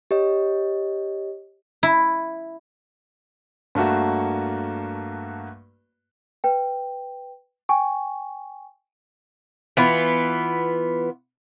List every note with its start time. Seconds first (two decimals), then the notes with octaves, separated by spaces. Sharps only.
0.11 G4 C#5 D#5
1.83 E4
3.75 G2 A3 A#3 F#4
6.44 B4 G5
7.69 G5 G#5 C#6
9.77 E3 B3 F4